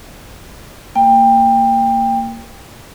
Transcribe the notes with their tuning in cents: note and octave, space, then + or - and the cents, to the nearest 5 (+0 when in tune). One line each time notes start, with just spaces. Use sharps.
A#3 -15 G5 +20